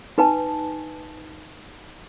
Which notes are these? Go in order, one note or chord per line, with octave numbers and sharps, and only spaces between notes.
D#4 B4 G#5 A5